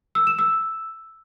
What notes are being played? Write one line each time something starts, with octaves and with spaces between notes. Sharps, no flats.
E6
E7
E6